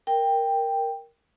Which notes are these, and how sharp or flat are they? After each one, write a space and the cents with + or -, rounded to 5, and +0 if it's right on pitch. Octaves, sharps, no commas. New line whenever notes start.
A#4 +0 G5 +5